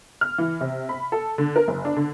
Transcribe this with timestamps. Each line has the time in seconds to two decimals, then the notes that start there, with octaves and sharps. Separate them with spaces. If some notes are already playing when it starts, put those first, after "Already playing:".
0.21 F6
0.38 E3
0.61 C3
0.89 B5
1.12 A4
1.38 D3
1.56 A#4
1.68 F#1
1.85 D4
1.96 D3